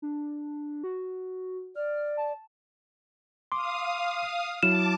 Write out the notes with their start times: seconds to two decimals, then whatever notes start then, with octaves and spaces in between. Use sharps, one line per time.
0.02 D4
0.84 F#4
1.76 D5 F6
2.17 A5
3.52 F5 C6 D6 D#6
4.63 F#3 E4 A5 D6 F6 E7